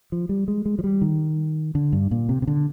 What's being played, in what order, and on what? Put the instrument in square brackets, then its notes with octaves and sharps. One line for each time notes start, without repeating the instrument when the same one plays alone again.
[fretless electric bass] F3
G3
G#3
G#3
F3
G3
D#3
D3
G2
A#2
C3
C3
D3